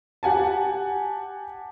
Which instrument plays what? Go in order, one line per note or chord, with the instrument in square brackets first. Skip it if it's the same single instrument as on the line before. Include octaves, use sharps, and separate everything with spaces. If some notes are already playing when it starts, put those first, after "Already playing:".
[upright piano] G4 F#5 G#5 A5